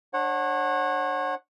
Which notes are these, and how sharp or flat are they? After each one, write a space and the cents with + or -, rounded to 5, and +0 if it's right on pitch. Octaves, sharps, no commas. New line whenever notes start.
D4 +10 C#5 -35 F#5 +0